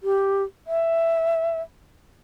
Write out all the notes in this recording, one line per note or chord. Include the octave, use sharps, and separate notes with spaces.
G4
E5